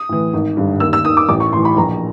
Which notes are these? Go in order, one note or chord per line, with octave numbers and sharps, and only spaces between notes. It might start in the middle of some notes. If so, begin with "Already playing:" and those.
Already playing: D#6
A2 E3
G#1
G2 D3
D#2 E6
E6
D#3 D#6
D6
A1 D6
C#6
A2 E3 C6
B5
A#1 A#5